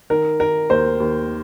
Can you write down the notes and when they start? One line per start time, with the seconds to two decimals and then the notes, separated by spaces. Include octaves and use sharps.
0.10 D#3 A#4
0.40 D#3 A#4
0.70 D#2 C5
1.00 D#2